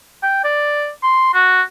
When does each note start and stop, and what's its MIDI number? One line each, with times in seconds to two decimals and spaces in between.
0.23 0.39 79
0.44 0.89 74
1.03 1.31 84
1.34 1.62 66